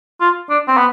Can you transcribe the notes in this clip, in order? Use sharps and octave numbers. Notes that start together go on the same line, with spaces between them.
F4
D4
C4
B3